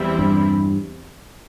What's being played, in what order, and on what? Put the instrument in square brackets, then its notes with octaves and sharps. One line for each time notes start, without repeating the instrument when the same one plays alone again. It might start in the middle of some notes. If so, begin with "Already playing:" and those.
Already playing: [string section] E2 E3 G3 C4 E4
[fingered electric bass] G2